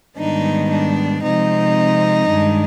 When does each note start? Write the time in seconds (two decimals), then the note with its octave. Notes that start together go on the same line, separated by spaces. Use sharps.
0.17 G#2 D#3 G3 B3 D4 D#4
0.70 D4
1.23 C3 F3 G#3 C4 D#4
2.29 G2 D#3 G#3 D4